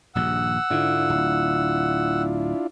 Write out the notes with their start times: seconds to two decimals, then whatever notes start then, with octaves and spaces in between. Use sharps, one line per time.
0.15 D#1 A#1 G2 F#5 E6
0.70 G#2 D3 D4 E4 F4
1.10 D1